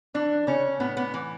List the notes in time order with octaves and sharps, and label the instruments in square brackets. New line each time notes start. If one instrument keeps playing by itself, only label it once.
[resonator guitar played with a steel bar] E3 D4
C#3 C#4
A2 B3
B3
E3